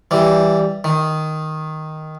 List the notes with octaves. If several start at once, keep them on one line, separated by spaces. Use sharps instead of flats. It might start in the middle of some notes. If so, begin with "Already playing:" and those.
E3 G3
D#3